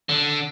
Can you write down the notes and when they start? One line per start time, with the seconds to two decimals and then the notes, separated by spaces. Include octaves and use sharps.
0.09 D3